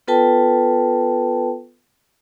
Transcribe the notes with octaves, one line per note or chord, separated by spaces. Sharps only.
B3 F4 A4 B4 G5 A5